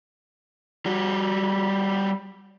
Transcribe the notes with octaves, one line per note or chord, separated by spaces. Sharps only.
G3 F#4